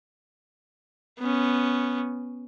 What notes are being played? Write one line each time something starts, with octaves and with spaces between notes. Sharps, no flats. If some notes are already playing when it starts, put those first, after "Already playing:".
B3 C#4